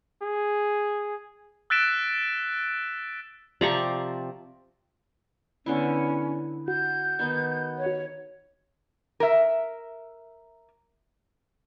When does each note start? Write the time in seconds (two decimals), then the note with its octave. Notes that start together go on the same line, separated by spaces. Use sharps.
0.23 G#4
1.70 E6 F#6 A6 B6 D7 E7
3.61 C3 F3 C4 D5 A#5 C#6
5.66 D3 B3 C#4 E4
6.68 F#4 G6
7.19 D#3 B3 D#4
7.78 C#5
9.20 A#4 E5